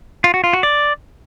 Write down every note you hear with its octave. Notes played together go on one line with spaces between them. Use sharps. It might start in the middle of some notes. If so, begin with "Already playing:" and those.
F4
F#4
F4
F#4
D5